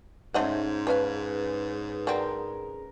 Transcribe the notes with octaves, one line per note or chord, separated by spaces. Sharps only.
G#2 A3 C#4 D#4 C5 D#5 F#5
F3 C#4 B4 F5
G#4
D3 F#3 C4 A#4